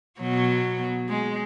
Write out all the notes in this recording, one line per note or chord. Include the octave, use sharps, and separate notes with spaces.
B2 F#3 B3
G#3